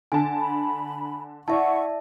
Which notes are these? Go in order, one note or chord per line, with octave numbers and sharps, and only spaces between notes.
D3 G#5 A5
B5
E4 D5 E5 F#5 A5 C#6